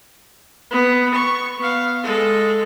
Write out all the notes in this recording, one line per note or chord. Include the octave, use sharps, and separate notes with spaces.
B3
C#6
B3 F5
G#3 A4